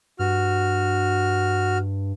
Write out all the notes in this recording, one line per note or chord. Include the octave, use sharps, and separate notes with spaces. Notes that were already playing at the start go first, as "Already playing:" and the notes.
G2 F#4 F6